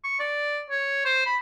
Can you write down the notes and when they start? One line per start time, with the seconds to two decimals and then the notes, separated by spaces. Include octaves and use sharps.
0.04 C#6
0.19 D5
0.70 C#5
1.05 C5
1.26 B5